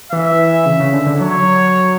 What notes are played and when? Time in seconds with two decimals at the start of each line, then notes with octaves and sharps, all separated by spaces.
0.12 E3 E5
0.66 C#3
0.80 C#3
0.93 D3
1.07 D3
1.21 F#3 C#5